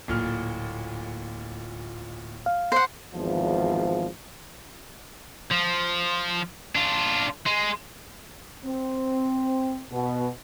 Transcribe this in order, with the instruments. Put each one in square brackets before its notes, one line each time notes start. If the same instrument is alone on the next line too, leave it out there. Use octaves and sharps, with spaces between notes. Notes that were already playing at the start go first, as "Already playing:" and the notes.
[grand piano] D1 A#2 F6
[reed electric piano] F5
[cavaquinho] C5 F#5
[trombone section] G#1 E2 F3
[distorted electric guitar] F3
D4 F4
G#3
[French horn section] C4
B2